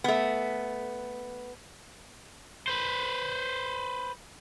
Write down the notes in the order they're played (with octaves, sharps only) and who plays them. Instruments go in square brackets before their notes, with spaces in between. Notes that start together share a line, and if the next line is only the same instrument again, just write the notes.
[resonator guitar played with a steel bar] A3 B3
[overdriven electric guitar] B4 C5